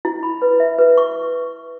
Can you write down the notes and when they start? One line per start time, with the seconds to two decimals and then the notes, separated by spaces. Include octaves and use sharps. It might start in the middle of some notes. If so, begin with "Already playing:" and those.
0.05 E4
0.23 B5
0.42 B4
0.60 E5
0.78 B4
0.97 C#6